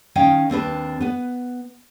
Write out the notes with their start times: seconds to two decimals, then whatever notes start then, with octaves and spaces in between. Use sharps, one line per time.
0.15 D#3 C#4 D#5 F5 G5
0.50 D#2 C4 D4 B4
1.01 B3 B4